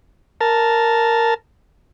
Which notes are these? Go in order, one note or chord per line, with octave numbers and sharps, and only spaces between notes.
A#4 A5